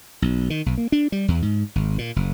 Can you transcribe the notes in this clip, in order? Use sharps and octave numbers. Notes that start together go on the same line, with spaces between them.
B1
D#3
B1
A#3
D4
G3
E2
G#2
G#1
A#2
F#1